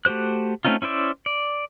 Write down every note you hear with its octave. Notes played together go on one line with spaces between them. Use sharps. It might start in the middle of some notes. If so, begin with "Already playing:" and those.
A3 F#4 G4 C5 F#6
A3 C4 C#4 D#4 F4
C#4 E4 C5 D5 E5
D5